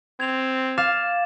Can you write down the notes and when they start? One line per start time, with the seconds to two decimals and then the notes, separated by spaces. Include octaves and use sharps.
0.20 C4 G#6 F7
0.78 F5 D6 A6 E7